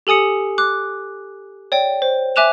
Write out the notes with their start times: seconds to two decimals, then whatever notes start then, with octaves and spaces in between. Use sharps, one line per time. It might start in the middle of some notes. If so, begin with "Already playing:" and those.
0.07 G4 A4 G#5 D#6 C#7
0.58 D6 F#6
1.72 C#5 D5 G5
2.02 C5
2.36 E5 G#5 D6 F#6 E7 F7